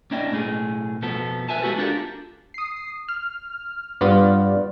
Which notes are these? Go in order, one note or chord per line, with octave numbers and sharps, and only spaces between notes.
A#3 C#4 D4 E4 D#5 G5
B1 A2 A3 G#4
F2 B2 F3 B3 A4
A#4 B4 E5 G#5 A5
G#3 B3 E4 F#4 G4 A4
D4 F4 G4 A4 A#4
D#6 C7
F6
G2 G3 B3 F4 D5